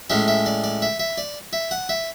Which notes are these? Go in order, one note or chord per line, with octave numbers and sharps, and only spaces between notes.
A2 G#3 C#4 E5
E5
D5
D5
E5
E5
D5
E5
F#5
E5